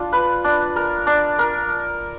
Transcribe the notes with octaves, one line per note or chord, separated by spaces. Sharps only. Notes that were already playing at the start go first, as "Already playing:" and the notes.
Already playing: D4 F4
B4
D4
A#4
D4
A#4